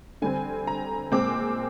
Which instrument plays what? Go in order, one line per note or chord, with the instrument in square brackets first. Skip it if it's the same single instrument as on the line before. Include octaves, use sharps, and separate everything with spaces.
[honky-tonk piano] D3 G3 C4 G#5
A#5
A#2 G#3 C4 D6